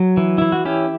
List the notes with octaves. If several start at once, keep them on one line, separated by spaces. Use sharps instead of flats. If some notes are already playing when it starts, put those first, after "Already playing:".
Already playing: F#3
E3
E3 E4
F#4
C#4 E4 G4